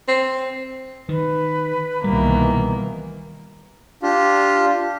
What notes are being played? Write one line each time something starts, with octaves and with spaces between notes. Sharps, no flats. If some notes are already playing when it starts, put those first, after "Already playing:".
C4
D#3 B4
C2 B2 D#3 E3 G3 A#3
D4 F4 G4